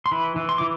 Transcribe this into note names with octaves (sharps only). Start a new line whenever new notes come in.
C6
E3 B5
E3
C6
E3 D6